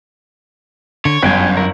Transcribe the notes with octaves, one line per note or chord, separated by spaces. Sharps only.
D3 C#5
G1 F#2 B4 G5 G#5
E4 A#4